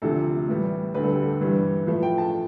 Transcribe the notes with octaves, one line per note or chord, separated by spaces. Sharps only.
D2 C3 F3 A4
A2 E3 G3
D2 D3 G3 B4
A4
G4
A4
G2 E3 G3
A2 F3 A3 B4
G5
A5